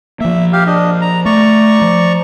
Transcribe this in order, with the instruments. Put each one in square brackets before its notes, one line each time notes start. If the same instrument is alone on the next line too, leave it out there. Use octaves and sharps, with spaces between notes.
[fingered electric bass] F3 A#3 [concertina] E5
[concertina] G4 F5
D4 D#5
A#5
[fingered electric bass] A3 [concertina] D5 A#5 C#6
[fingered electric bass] F3